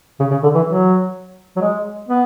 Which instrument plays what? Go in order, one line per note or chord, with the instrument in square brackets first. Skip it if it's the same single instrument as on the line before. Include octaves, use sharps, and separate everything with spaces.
[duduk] C#3
C#3
D3
E3
F#3
F#3
G#3
B3